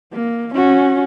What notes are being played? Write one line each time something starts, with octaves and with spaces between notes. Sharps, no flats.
A#3
C#4 F#4